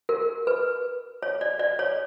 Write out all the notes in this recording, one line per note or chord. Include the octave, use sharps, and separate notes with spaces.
A#4
B4
C#5
D5
D5
C#5